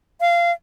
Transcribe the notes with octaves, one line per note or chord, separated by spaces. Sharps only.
F5